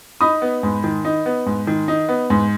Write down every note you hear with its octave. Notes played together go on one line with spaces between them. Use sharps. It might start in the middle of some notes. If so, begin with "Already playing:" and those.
D#4 B5 D#6
B3
G#2
D#3
D#4
B3
G#2
D#3
D#4
B3
G#2